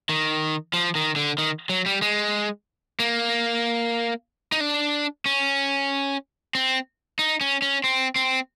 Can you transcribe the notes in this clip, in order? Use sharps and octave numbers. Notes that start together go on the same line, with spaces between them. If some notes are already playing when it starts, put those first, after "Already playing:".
D#3
F3
D#3
D3
D#3
F#3
G3
G#3
A#3
D#4
D4
C#4
C4
D#4
C#4
C#4
C4
C4